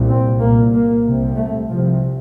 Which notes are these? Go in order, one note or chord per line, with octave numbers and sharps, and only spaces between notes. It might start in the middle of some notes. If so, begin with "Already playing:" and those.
Already playing: C2 A#2
C4
C2 A#2 A#3
A#3
C2 C3
A3
C2 C3 F3